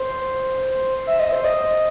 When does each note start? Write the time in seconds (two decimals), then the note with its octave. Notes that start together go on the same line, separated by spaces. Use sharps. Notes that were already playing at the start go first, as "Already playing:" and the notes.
Already playing: C5
1.07 E5
1.19 D#5
1.32 C5
1.44 D#5